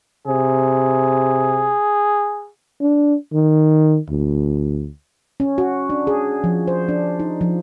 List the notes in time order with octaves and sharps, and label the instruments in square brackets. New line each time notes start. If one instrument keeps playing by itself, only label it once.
[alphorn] C3 [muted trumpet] G#4
[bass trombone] D4
D#3
D2
[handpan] C#4
F#4
D4
G#4
F3
C5
D4
D#4
F3